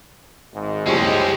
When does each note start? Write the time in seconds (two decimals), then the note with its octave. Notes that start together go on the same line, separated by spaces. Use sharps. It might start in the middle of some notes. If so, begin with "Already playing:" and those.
0.53 G#1 G#2
0.87 F#1 C2 F2 G#3 C#4 G4 C5 D#5